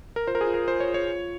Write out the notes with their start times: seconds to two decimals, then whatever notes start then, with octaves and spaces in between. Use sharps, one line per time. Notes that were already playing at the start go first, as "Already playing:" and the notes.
0.16 A#4
0.27 F4 C5
0.35 A#4
0.41 G#4
0.47 F4
0.54 A#4
0.67 F4 C5
0.80 C#5
0.88 F4
0.94 C#5
1.08 F4